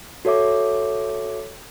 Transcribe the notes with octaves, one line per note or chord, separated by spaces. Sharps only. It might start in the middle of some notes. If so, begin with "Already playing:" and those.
F#4 A4 C#5 E5 D6